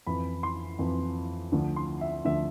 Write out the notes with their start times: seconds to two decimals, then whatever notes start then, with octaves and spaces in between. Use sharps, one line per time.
0.07 F2 E3 B5
0.43 C6
0.79 F2 E3
1.52 D2 D3 F3
1.76 C6
2.01 E5
2.25 D2 D3 F3 E5